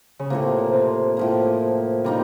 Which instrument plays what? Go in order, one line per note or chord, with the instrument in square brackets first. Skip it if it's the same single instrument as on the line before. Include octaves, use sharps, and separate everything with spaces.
[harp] C#3
[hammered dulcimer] A2 F3 A#3 [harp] C3
[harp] C3
[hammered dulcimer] A2 F3 A#3
[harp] C3 [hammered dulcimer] G3 A#3 D#4